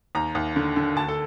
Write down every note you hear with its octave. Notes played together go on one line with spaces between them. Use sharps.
D#2 A#5
D#2
D3
D3
D2 A5
A4